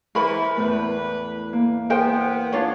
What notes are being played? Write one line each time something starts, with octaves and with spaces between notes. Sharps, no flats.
E3 E4 A#4 C5 B5
E2 A2 A3 B4
A#3
B3 A#4 C5 G5
D4 F4 C#5